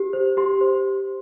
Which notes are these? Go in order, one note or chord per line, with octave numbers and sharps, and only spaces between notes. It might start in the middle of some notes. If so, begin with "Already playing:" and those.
Already playing: G4
C5
G4 C6
C5